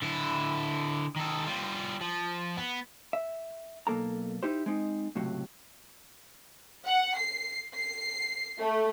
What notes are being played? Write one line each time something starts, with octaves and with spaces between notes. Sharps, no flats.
D3 E4
D#3 A4
G3 F4
F3
B3
E5
B1 F2 A#3 A4 A#5
D#4 E4 G4 C5
G#3 C4 D#4
C#2 A2 C3 F#3
F#5
C7
C7
A3